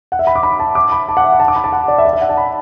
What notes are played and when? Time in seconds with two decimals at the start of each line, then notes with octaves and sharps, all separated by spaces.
0.12 F#5
0.19 E5
0.27 B5
0.36 D6
0.43 B5
0.60 A5
0.75 D6
0.92 B5
1.09 A5
1.17 F#5
1.24 E5
1.32 F#5
1.40 A5
1.48 D6
1.56 B5
1.64 A5
1.72 F#5
1.88 D5
1.98 E5
2.05 D5
2.13 E5
2.21 F#5
2.29 A5
2.37 B5